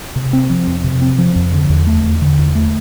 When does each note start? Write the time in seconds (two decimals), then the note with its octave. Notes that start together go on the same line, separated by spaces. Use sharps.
0.16 C3
0.33 C4
0.50 F3
0.67 F2
0.84 C3
1.02 C4
1.18 F3
1.36 F2
1.53 D3
1.70 E2
1.87 A3
2.04 E2
2.21 D3
2.38 E2
2.55 A3